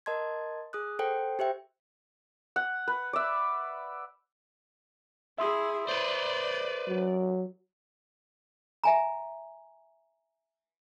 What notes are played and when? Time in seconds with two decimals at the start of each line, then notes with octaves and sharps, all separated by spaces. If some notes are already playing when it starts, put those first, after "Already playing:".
0.06 A#4 D#5 A5 C6 G#6
0.73 G#4 D#6 F#6
0.99 A4 C5 F#5 G5
1.39 G4 C5 E5 G5
2.56 F#5
2.88 B4
3.13 D5 E5
5.38 E4 G#4 E5 C6 D#6
5.88 B4 C5 D5
6.87 F#3
8.84 E5 G#5 A#5